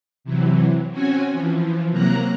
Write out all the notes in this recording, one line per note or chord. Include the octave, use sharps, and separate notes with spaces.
C3 E3 F#3
C4 C#4 F#4 C#5 G#5
E3 F3
C3 F#3 A#3 A#5 F#6